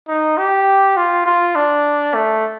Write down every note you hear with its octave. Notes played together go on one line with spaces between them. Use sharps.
D#4
G4
F4
F4
D4
A3